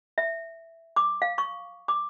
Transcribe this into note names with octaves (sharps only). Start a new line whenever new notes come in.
E5
D6
F5
C#6
D6